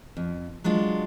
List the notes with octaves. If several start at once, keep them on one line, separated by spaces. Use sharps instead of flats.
F2
F#3 G#3 D4 F4